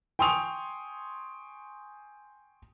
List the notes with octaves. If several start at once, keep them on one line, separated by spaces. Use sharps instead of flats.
G5 G#5 C6 C#6 D#6 F7